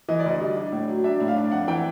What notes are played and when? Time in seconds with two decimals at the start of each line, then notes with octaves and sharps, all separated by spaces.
0.09 E3 D#5
0.20 D5
0.25 D2 D#5
0.40 G3
0.57 D4
0.72 A2
0.88 F#3
1.04 D4 E5
1.20 A2
1.28 F5
1.36 D4
1.52 F2 F#5
1.68 E3 G5